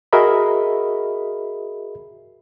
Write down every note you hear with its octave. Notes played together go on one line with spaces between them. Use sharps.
F#4 G#4 A#4 D#5 E5 B5